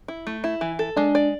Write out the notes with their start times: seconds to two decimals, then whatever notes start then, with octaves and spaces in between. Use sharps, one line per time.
0.08 E4
0.27 A3
0.44 E4
0.61 E3
0.79 A4
0.97 G#3 D4
1.15 D5